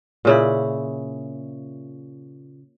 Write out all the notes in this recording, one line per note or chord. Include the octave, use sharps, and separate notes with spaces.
A#2 C#3 E4